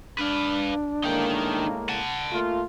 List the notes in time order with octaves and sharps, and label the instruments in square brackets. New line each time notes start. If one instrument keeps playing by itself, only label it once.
[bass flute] D4 [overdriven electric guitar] B4 F5
[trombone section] A2 G#3 A#3 [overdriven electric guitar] D#4 G5
[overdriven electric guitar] F#5 A5
[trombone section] A3 A#3 F4